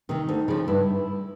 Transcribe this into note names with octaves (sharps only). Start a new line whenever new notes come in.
C3 D#3 D#4
D2
C#3 F3
G2 E4